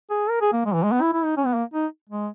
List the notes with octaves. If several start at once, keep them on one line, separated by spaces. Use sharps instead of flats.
G#4
A#4
G#4
A#3
G#3
E3
G#3
B3
E4
E4
D#4
C#4
B3
A#3
D#4
G#3